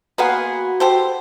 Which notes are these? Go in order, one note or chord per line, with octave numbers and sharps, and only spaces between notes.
A#3 B3 F#4 G#4 B4 F#5 C6
G4 A4 C5